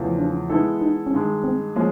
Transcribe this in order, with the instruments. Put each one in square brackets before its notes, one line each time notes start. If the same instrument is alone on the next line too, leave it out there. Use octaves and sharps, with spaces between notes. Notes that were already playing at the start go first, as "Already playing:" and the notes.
Already playing: [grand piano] E2 C#3 F3 A3
[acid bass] D4
[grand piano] E3 G#3 B3 E4 A4 [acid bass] D#4
[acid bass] D#4
C#4
[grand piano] G2 D#3 G#3 [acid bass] D4
[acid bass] C4
[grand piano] F3 G#3 C#4 [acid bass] A#3